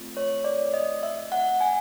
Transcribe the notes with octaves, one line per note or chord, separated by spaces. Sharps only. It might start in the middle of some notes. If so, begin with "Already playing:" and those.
Already playing: A3 C4 F4
C#5
D5
D#5
E5
F#5
G#5